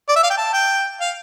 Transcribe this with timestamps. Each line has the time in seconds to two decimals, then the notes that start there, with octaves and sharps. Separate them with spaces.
0.09 D5
0.16 E5
0.23 F5
0.30 G5
0.37 A5
0.53 G5
1.00 F5